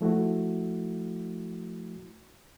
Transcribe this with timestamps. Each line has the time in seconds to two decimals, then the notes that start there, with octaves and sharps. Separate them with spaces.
0.01 F3 A3 E4 F#4